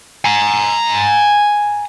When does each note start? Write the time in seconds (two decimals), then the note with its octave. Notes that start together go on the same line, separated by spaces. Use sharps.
0.25 G#5 A#5